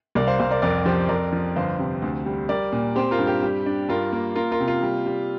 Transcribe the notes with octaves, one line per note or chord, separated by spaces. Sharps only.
C2 A#4 D5
C5 F5
C2 C5 F5
A#4 D5
F2 A#4 D5
F3 G4 C5
F2 A#4 D5
F3
G1 C5 F5
C3
D2
G3
G3 A#4 D5
A#2
C4 G4 C5
F4 A#4
G2
G4
G3
D4
G2 F4 A#4
A#3
A#3 F4 A#4
F4 A#4
C3
F4
G3
G3